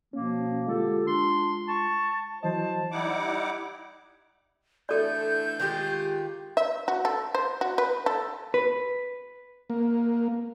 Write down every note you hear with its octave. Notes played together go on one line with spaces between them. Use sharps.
B2 F3 A#3 C#4
D3 G#3 F4 G4 A4
D4 C6
A5 C#6
E3 F#3 C5 D#5 A5
G3 D#4 E4 F#5 D6
D3 E3 A3 A4 D5 G6
D#3 G#3 F4 G4
E5
F#4
A4
C5
F#4
B4
A4
B4
A#3